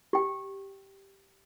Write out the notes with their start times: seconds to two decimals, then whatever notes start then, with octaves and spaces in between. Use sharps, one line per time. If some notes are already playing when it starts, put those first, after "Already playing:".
0.13 G4 G5